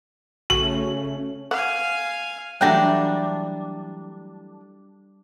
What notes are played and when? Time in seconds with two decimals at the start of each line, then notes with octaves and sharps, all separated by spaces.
0.50 C#3 A3 C#4 F#4 F#7
1.51 F5 F#5 G#5
2.61 E3 F#3 G3 A3 D4 F#5 G5 A#5